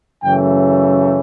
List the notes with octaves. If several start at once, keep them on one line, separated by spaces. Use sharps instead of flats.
F#2 C#3 E3 A3 G5